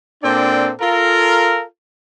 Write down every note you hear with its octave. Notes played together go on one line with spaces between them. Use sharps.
A#2 C4 D4 A4 D5 G5
F4 A4 A#4